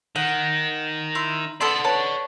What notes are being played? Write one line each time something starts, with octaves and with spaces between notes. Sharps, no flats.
D#3 F#5
E4 C6
B3 A4 D5 F#5 C6
B4 C#5 A5